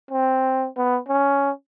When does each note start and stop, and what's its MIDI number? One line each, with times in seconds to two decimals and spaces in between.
0.11 0.67 60
0.77 0.99 59
1.08 1.51 61